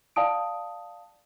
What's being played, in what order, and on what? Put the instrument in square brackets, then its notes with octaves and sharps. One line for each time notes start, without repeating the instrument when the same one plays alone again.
[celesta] D5 F5 G5 A5 D#6 D7